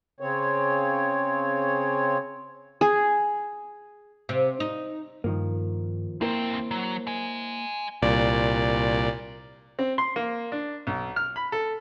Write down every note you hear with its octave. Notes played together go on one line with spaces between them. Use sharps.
C#3 C4 C#5
G#4
C3
D#4
G2 D#3 F3 A#3
D#2 A#3 C4 E4 A#4 C5
F#3
D#5 G#5
C2 A#2 D5
C4
C6
A#3
D4
B1
F6
B5
A4